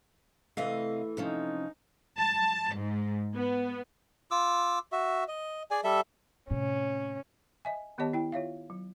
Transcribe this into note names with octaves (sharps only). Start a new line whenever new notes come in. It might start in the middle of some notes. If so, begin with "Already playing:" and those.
C3 E3 A3 D#5 F5
C3 F3 C#4 D#4
A5
G#2
B3
F4 D6 E6
F#4 E5
D#5
G#4 D5 G#5
G3 A4 E5
A2 C3 C#4
D#5 E5 G#5
D#3 B3 G4 C#5 D#5 A5
E4 G5
F4 C#5 E5 F5
F#3